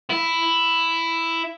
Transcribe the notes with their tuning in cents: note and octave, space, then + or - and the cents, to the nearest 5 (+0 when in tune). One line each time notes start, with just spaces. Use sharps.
E4 +5